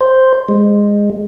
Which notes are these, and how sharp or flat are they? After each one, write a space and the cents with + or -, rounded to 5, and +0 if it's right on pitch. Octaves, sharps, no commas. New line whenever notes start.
C5 +0
G#3 -15